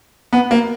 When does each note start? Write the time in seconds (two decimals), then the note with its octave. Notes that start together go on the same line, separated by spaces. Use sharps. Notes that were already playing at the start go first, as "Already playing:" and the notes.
0.33 B3
0.51 A#3